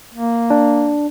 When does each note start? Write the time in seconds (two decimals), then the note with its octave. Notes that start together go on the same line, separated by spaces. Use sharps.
0.14 A#3
0.50 D4